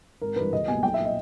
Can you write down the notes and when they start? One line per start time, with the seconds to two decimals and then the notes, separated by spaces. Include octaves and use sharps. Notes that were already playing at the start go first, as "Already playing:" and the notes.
0.21 G#1 A#4
0.36 G2 E3 B4
0.52 C#2 D#5
0.68 B2 G3 A#3 G#5
0.83 B1 G5
0.94 E5
0.99 A#2 A#3
1.05 D#5